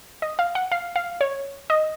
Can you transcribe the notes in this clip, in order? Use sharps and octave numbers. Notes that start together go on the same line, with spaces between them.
D#5
F5
F#5
F5
F5
C#5
D#5